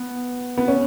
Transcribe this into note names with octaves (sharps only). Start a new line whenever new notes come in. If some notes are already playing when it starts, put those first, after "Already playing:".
Already playing: B3
B3
C#4